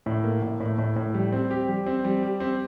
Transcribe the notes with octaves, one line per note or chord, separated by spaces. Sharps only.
A2
A#3
A2
A2
A2
A2
G3
C4
G4
G3
C4
G3
G4
C4